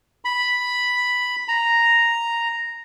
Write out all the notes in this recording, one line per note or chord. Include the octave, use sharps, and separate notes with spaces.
B5
A#5